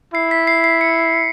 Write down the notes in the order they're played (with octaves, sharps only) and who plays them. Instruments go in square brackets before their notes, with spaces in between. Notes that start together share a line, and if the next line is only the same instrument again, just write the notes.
[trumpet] E4 [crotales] C7
[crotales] B6
C7
C7
C#7